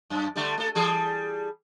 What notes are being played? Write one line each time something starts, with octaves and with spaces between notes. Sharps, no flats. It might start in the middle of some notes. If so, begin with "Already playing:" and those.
F#2
D3 G3 A3
A3 A4
E3 G3 G#4